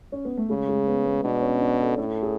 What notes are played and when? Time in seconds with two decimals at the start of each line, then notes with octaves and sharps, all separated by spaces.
0.12 C#4
0.25 B3
0.37 A3
0.50 C#3 G#3
0.68 G#3
0.87 B3
1.05 B3
1.24 B2 D4
1.42 C#4
1.61 D4
1.79 A4
1.98 A2 A4
2.23 G#4